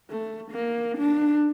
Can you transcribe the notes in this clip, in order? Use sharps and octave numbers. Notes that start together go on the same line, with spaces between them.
A3
A#3
D4